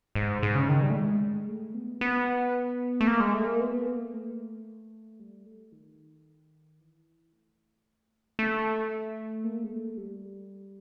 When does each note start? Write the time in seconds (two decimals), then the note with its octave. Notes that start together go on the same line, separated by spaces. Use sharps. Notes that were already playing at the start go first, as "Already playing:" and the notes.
0.15 G#2
0.43 G#2
0.55 C#3
0.69 D#3
0.82 G3
0.90 A3
0.95 G#3
1.48 A3
1.74 B3
2.01 B3
3.01 A3
3.07 A#3
3.20 G#3
3.34 A3
3.47 A#3
3.60 B3
3.87 A#3
4.14 A3
5.20 G3
5.46 A3
5.72 D#3
6.79 E3
7.33 A3
8.39 A3
9.44 A#3
9.64 G#3
9.71 A3
9.97 G3